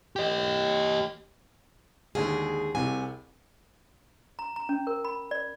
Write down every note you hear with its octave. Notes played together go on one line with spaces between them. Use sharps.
G4 D#5
D#2 D3 G#3 G#4
C2 C3 G#5
A#5
A#5
C#4
A#4
B5
D5